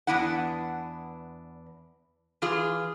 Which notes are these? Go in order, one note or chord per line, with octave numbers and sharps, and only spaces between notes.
E2 E3 B3 D4 E4 F#5
E3 F4 G#4